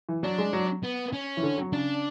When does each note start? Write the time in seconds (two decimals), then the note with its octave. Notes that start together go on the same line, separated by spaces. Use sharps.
0.09 E3
0.23 F#3 D4
0.38 G#3
0.53 F#3
0.83 B3
1.13 C#4
1.37 E3
1.43 D3
1.58 F#3
1.73 C#3 D4